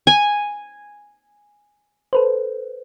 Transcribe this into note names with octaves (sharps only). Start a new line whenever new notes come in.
G#5
A4 B4 C5